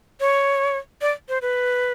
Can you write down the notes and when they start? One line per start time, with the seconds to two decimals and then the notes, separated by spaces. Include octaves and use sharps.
0.20 C#5
1.01 D5
1.29 C5
1.42 B4